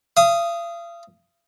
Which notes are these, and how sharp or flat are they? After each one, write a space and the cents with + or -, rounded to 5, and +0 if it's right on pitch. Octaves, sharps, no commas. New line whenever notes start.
F5 -40 D#6 +0